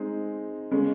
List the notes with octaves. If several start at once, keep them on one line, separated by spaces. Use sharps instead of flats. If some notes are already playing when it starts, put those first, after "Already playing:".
Already playing: G#3 C4 D#4
C#3 G#3 C#4